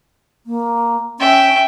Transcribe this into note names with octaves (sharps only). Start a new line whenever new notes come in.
A#3
C#4 E5 G5